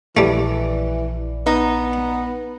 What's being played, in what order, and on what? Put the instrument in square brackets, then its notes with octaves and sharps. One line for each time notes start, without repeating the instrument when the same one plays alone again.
[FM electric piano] A#1 D5 [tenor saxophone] E3 [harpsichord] G3 A3
[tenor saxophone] B3 [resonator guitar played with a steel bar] D#4